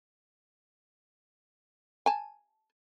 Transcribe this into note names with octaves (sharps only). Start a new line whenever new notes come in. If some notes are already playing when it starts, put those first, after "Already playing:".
G#5 A5